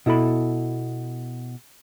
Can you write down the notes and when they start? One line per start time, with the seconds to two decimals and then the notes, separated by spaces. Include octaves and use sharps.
0.06 B2 E4 A4 B5